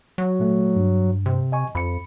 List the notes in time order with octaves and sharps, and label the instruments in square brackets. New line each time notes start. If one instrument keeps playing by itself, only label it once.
[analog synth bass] F#3
[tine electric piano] A#2 A3
G2
[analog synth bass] C3
[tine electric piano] D#5 G#5 C#6
[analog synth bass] F2 [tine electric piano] B5 C#7